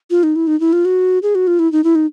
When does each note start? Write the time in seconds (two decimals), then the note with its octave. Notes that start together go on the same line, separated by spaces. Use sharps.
0.10 F4
0.23 D#4
0.36 E4
0.47 D#4
0.60 E4
0.73 F4
0.85 F#4
1.23 G#4
1.35 F#4
1.47 F4
1.59 E4
1.72 D#4
1.84 E4
1.95 D#4